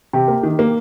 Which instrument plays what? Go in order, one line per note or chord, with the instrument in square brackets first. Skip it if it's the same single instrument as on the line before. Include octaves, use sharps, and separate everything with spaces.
[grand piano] C3 G4
A#3
D#3
A#3